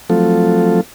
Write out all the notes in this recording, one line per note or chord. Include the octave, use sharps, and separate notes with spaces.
F3 F#3 A3 C4 F4 A4